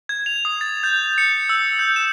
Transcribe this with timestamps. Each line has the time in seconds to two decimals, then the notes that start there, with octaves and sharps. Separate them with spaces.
0.09 G#6
0.26 F7
0.45 D#6
0.61 A6
0.83 G6
1.18 C#7
1.49 E6
1.79 G6
1.96 E7